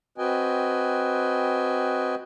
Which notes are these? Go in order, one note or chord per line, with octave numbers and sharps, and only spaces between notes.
C4 F#4 B4 D#5 G5 G#5